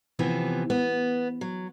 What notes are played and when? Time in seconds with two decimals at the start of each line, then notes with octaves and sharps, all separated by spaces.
0.19 C3 E3 F3 B3
0.70 B3
1.41 F#3